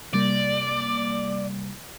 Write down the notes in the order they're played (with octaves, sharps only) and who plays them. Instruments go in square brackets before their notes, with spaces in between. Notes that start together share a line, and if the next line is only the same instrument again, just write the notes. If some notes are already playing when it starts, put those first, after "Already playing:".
[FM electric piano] C3 G3 A#3 [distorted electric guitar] D5